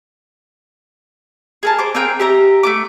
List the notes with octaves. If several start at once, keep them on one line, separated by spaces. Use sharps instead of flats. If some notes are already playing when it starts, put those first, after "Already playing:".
G#4 A#4 A5
C5 D6
C4 G#4 A#4 G5
G4 E5 A#5
A3 F4 D6